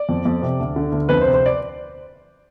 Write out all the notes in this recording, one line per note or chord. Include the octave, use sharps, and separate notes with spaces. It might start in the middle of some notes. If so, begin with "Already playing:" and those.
Already playing: D5
F2
F2
C3
D2
D3
D2
F2 B4
C5
C3
C5
D5